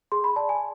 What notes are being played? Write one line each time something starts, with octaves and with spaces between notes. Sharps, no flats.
G#4 C6
B5
D5 A5
G#5